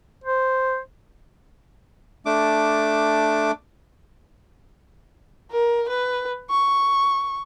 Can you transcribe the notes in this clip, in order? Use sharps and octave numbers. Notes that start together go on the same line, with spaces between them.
C5
A3 D4 D6
A#4
B4
C#6